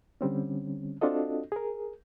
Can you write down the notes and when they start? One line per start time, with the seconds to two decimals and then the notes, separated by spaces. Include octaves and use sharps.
0.21 D3 G3 C4 C#4
1.01 C4 D4 F4 F#4 A4 D#5
1.52 G#4 A#4